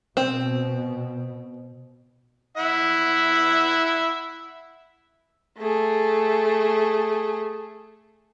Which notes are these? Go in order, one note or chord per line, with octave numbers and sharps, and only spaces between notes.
B2 C4
E4 E5 F#5
A3 G#4